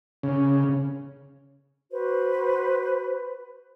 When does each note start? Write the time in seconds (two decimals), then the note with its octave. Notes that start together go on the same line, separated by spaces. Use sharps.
0.23 C#3
1.92 F#4 B4 C5